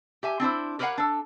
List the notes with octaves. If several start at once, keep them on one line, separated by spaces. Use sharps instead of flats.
G4 E5 G#5
C4 D4 E4 C5
G4 A#4 B4 C#5 F5 F#5
D4 A4